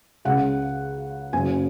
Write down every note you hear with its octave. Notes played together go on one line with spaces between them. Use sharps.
C#2 C#3 F#5
F#1 F#2 C#3 G#5